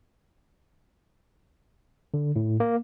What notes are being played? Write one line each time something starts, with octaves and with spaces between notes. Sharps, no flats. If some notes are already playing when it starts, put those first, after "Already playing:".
D3
A2
A#3